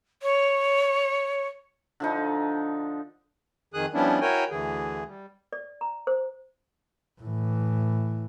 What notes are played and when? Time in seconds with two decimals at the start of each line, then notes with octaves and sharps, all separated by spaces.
0.22 C#5
2.00 D3 F3 D#4
3.74 F2 D#3 G#4 D#6 F#6
3.94 F3 G3 B3 C#4 D4 E4
4.21 E4 F#4 A#4 C#5 G5 G#5
4.51 D2 D3 E3 G#4
5.06 G3
5.53 D5
5.81 A#5
6.07 C5
7.21 A2 E3